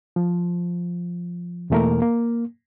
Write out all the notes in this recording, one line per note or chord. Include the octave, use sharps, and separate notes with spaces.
F3
E2 B2 E3 A3 A#3 A#4
A#3